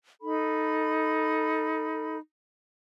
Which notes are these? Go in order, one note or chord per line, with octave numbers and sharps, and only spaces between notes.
D#4 A4 B5